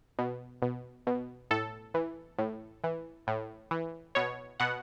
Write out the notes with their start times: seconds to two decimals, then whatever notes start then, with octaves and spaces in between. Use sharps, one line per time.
0.19 B2
0.62 B2
1.07 B2
1.51 A2 A4
1.94 E3
2.38 A2
2.84 E3
3.27 A2
3.71 E3
4.15 B2 C#5
4.60 B2 F#5